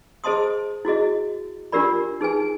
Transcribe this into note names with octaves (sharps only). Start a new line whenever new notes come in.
G#4 C5 D#5 A5 C6 D#6
E4 F#4 G#4 D#5
D4 F4 G4 A#4 D5 B5
D#4 G#4 B4 G#5